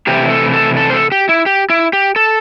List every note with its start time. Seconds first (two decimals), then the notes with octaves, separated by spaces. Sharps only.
0.07 C3 E3 A3 E4 G4
0.30 A4
0.53 A4
0.77 A4
0.90 C5
0.94 A4
1.12 G4
1.29 E4
1.46 G4
1.70 E4
1.93 G4
2.16 A4